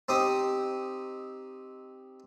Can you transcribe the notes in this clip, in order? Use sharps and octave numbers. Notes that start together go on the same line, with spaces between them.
C4 D#4 G4 D#6